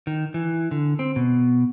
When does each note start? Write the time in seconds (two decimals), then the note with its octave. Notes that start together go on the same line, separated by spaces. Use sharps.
0.07 D#3
0.34 E3
0.71 D3
0.99 C4
1.16 B2